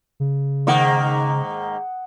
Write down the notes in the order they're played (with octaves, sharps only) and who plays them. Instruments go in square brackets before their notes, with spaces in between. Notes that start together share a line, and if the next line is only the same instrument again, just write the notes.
[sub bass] C#3
[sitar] G#2 D#3 A#3 [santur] F#5 D#6